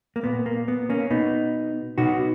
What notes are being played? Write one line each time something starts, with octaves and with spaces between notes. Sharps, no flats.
A#3
A#2 B3
A#3
B3
A#3 C#4
B2 B3 D#4
B2 D#4 F#4